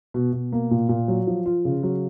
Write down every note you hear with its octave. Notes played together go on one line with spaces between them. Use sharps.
B2
B2
A#3
A#2
A#2
F#3
F3
F4
C#3
F#3